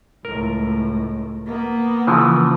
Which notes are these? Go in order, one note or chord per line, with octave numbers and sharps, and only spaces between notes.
C#2 A2 A#4
A#3 B3
C#3 E3 F3